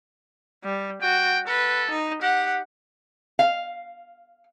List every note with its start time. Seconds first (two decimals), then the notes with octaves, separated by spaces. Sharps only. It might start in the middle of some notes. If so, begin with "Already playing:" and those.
0.64 G3
1.02 F#4 G5
1.47 A4 B4
1.91 D#4
2.22 G4 F#5
3.39 F5